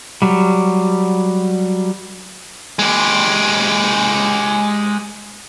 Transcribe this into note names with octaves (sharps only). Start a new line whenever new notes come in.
F#3 G3
G#3 G4